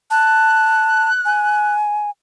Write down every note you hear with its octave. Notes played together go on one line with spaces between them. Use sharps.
A5 F#6
G#5